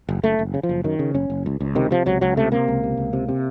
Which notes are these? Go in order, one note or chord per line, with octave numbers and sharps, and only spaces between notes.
F#1
F#1 A3
F#1
C#3
F3
F#1
F#2 D#3
C#3
F#1 C#4
F#1
C#2
C#2
C3 D#3
C3 F3
C#2 F#3
C#2 F#3
C3 A3
C3 A#3
C#2
C3
C#2
C3
C3